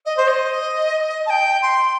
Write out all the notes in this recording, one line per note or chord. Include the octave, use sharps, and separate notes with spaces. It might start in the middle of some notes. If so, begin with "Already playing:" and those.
D#5
C5
D#5
A5
G5
C6